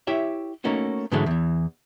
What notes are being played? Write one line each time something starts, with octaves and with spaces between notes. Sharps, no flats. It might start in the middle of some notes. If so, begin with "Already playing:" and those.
E4 G4 C#5 E5
A3 A#3 C#4 D#4 F#4
G#2 D3 E3 F#3 G#3 A3
E2 E3